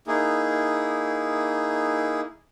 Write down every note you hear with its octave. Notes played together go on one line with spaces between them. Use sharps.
A#3 D#4 E4 G#4